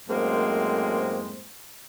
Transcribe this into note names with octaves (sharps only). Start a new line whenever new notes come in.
F#2 A2 G#3 A#3 C4 C5